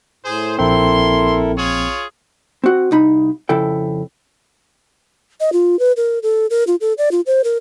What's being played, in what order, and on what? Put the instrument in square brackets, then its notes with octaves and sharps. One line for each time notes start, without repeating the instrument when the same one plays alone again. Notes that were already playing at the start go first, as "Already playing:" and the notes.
[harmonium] A2 [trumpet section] G#4 C5
[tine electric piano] A#1 C4 [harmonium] E4 A4 A#4 [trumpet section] C6
[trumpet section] F4 G#4 C#5
[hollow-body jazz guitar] C4 F#4
C2 D#4 B5
F2 C#3 E4 A4 G5
[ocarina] D#5
F4
B4
A#4
A4
A#4
F4
A4
D5
F4
C5
A#4